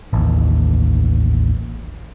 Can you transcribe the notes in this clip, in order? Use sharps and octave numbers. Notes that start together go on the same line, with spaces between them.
A1 D#2